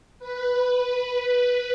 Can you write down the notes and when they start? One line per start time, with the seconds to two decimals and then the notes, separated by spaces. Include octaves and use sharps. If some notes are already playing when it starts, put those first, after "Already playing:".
0.19 B4